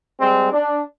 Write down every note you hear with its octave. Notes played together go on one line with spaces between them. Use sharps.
G3 G#3 C4
D4